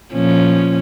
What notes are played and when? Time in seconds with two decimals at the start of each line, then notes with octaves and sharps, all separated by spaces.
0.13 A#2 F3 C#4